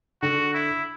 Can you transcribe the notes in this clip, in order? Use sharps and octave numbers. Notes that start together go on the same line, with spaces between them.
D3 F#4
E4